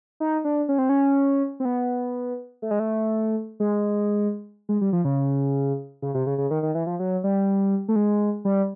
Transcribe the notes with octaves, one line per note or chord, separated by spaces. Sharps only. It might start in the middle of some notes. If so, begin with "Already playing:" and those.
D#4
D4
C#4
C4
C#4
C4
B3
A3
G#3
A3
G#3
G#3
G3
F3
C#3
C#3
C3
C#3
C#3
D#3
D#3
E3
F3
F#3
G3
A3
G#3
G3